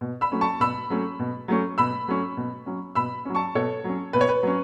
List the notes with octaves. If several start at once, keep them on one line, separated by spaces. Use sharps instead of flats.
B2
B5 E6
F#3 A3 C#4
A5 C#6
B2 B5 E6
F#3 A3 C#4
B2
F#3 A3 C#4
B2 B5 E6
F#3 A3 C#4
B2
F#3 C#4
B2 B5 E6
F#3 C#4
A5 C#6
B2 A4 C#5
F#3 C#4
B2 B4
C#5
B4
F#3 C#4